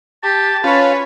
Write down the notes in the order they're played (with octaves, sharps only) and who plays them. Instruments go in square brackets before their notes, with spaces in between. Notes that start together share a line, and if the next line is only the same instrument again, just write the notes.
[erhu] G4 [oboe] A5
[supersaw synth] C#4 C#5 [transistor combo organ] F4 [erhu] B4